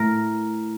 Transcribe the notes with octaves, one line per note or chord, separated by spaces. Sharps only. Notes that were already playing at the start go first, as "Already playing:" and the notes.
Already playing: A2 A#4